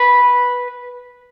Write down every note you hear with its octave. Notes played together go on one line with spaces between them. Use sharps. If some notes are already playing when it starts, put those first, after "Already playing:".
Already playing: B4